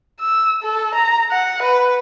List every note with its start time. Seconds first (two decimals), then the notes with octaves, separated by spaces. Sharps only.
0.20 E6
0.63 A4
0.95 A#5
1.30 F#5
1.62 B4